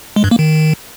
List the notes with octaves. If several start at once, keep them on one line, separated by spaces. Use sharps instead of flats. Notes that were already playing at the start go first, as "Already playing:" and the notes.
G#3
G2
A#3
D#3